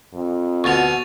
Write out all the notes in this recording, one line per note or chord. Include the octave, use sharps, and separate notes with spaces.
F2
D2 B2 C#6 A6 F7